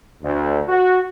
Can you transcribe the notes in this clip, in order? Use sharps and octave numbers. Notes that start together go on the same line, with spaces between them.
D2
F#4